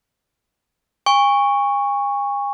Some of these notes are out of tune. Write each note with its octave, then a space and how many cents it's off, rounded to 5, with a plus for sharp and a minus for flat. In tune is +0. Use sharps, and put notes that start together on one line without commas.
G#5 -40 C#6 +0